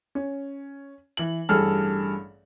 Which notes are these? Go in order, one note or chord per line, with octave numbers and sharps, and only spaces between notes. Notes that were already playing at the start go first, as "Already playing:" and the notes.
C#4
E3 F#7
A1 G2 G#4 A4 F6